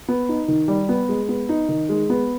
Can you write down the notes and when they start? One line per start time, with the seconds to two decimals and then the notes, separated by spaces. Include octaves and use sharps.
0.08 B3
0.29 D#4
0.48 D#3
0.68 G3
0.89 B3
1.09 G#3
1.29 B3
1.49 D#4
1.69 D#3
1.89 G#3
2.10 B3